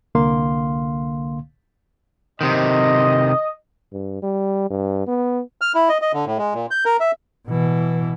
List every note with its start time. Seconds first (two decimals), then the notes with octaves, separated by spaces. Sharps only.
0.15 C2 D3 A#3 F5 C6
2.41 C3 D#3 D#5
3.92 G2
4.22 G3
4.70 G2
5.07 B3
5.61 F6
5.75 E4
5.89 D#5
6.02 D#5
6.13 D3
6.26 A2
6.38 G#3
6.54 A#2
6.71 G6
6.85 A#4
7.00 E5
7.48 B2 E3